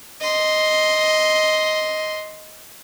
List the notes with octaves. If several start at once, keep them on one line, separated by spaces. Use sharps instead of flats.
D#5 C6